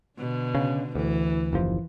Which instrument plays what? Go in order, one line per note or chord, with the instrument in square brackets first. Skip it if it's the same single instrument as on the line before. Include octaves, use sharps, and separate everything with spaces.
[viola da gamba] B2 D3
[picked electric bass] C#3
[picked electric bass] D2 [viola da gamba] E3
[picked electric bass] F#1 D#2 F3